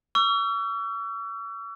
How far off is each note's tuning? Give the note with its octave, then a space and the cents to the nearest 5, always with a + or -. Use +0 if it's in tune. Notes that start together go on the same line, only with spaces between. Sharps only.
C#6 +45 E6 +40